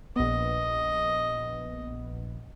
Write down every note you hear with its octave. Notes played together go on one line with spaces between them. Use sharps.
A#1 B3 D#5